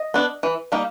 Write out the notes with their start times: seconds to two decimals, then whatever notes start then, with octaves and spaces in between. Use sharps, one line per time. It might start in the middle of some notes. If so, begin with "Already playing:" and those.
Already playing: D#5
0.14 B3 D4
0.43 E3
0.72 G3 A#3 D#4